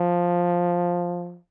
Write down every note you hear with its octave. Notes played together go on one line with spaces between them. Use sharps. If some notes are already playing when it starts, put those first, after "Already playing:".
Already playing: F3